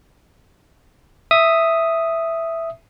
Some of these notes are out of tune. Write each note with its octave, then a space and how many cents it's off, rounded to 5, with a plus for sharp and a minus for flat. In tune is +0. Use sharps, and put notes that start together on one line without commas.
E5 +0 D#6 +0